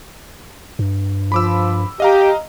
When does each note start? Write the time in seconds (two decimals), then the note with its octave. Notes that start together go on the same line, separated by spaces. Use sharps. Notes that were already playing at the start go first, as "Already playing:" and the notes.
0.79 G2
1.32 F3 B5 D6 E6
2.00 G4 D#5 F5 A#5